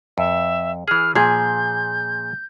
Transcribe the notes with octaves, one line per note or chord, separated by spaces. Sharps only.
F2 E5
E3 G#4 F6
A#2 F3 G#4 G6